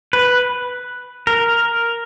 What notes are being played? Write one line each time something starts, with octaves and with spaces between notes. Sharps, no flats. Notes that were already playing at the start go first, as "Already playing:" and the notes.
B4
A#4